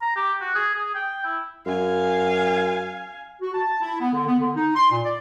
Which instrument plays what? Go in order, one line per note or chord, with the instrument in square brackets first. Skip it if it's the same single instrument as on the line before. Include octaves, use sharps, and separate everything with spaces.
[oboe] A#5
G4
F#4
G#4
G#4
G5
E4
[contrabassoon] F#2 [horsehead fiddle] F5 G#5
[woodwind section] F#4
A5
E4
B3
D3
B3
D3
D#4
C6
A#2
D5